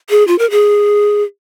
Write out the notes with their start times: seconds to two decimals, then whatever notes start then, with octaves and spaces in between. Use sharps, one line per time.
0.10 G#4
0.27 F4
0.39 A#4
0.51 G#4